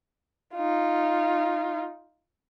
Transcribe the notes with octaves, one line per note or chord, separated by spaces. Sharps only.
D#4 F4